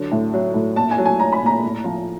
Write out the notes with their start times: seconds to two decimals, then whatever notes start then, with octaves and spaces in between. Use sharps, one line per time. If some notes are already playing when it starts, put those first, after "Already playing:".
Already playing: D3 F#3
0.11 A2
0.34 F#3
0.54 A2
0.76 A#2 A5
0.91 G#5
0.98 F#3
1.06 G#5
1.19 F#3 A#5
1.32 B5
1.41 A#2
1.46 A#5
1.63 A2
1.84 F3